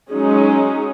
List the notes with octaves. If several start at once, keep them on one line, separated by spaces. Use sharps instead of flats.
F#3 G#3 C#4 D#4 G#4